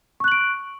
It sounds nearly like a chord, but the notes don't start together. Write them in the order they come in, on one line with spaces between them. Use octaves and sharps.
C#6 F#6 F#7 D7